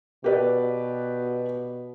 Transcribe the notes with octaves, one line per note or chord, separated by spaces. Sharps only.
B2 G4 B4 D5